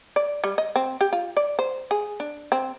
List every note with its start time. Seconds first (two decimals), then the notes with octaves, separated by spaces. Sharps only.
0.16 D5
0.44 G3
0.58 D#5
0.76 C4
1.01 G4
1.13 F4
1.37 D5
1.59 C5
1.91 G#4
2.20 D4
2.52 C4